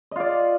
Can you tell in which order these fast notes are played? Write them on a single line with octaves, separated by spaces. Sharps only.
D#5 F4 D5